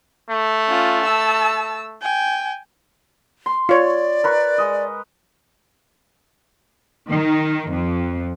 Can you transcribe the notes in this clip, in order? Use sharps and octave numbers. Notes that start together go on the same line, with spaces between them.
A3
C#4 F4
A5 E6
G5 G#5
C6
F4 C#5 D5
A#4 B4 C#6
G#3 D#5
D#3
F2